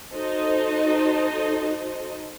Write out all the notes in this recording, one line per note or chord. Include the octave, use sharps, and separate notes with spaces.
D#4 F#4 A4 C5 D#5